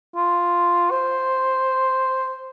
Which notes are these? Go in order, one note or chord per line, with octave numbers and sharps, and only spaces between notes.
F4
C5